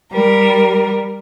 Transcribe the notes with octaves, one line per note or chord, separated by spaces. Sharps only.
G3 A#4